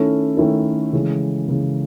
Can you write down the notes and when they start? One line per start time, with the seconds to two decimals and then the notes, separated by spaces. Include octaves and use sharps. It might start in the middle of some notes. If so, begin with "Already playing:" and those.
Already playing: D#3 A3 C#4 E4 A4
0.37 D#3 A3 C#4 E4 A4
0.93 C#3 E3 G#3
1.48 C#3 E3 G#3